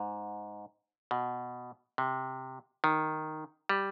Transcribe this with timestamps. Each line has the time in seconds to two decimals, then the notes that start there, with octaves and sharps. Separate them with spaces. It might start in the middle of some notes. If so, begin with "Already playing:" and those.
Already playing: G#2
1.11 B2
1.98 C3
2.84 D#3
3.69 G3